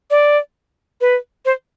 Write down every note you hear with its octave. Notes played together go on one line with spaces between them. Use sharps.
D5
B4
C5